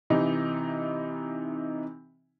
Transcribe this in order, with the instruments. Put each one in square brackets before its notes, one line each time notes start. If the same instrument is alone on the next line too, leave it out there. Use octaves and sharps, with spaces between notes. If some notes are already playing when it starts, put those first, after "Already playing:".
[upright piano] C3 E3 D#4